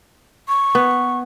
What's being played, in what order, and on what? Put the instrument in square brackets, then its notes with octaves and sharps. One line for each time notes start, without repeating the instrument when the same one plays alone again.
[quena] C#6
[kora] B3